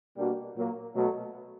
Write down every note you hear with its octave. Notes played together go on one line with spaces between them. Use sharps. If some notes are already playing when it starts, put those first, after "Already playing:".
B2 G3 A#3 D4 F#4
A#2 F#3 A#3
B2 F#3 A3